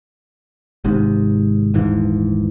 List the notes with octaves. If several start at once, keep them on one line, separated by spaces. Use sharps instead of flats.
G#1 G#2 C3
D#1 G#2 E3